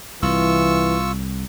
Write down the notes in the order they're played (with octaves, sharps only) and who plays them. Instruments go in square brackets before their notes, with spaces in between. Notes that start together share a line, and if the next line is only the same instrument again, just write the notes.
[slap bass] C2 [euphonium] E3 [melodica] F4 C#6 E6